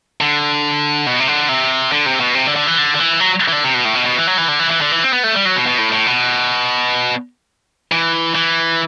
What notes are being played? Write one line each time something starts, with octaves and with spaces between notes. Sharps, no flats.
D3
B2
C3
D3
C3
D3
C3
B2
C3
D3
D3
E3
D3
D3
E3
F#3
E3
D3
C3
B2
A2
B2
B2
E3
F#3
E3
D3
E3
E3
D3
E3
C4
B3
A3
G3
F#3
B2
B2
A2
A2
B2
E3
E3